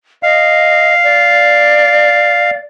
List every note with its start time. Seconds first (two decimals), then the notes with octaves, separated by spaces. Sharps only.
0.23 D#5 F5
1.04 D5